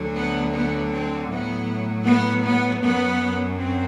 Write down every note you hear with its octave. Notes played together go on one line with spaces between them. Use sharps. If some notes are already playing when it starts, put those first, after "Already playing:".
Already playing: D2 D3 F#3
B3
B3
C4
A2 F#3 B3
B3
B3
F#2 F#3 B3
C4